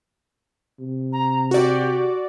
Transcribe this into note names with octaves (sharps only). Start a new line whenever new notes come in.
C3
A#5
F#4 G4 D5